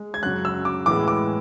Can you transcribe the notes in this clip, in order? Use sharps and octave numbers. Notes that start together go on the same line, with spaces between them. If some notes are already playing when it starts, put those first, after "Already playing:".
Already playing: G#3
G#6
F#2 C#3 F#3 F#6
E6
D6
A2 E3 G#3 B3 D6
D6